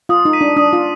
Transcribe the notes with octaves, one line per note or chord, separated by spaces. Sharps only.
F4 D#6
D#4
B6 D#7
D4
D4 D#6
F4